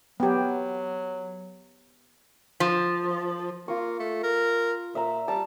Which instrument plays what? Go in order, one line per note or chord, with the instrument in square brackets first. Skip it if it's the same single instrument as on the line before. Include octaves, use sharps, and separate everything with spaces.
[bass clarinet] F#3 [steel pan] B3 G4
[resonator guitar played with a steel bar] F3
[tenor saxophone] A#3 [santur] F4 C#6
[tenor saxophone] A3
A#4
[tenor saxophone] A#2 [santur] E5 A#5
[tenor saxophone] G3 [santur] A5